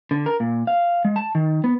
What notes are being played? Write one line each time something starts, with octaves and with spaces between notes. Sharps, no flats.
D3
A#4
A#2
F5
G#3
A5
D#3
B3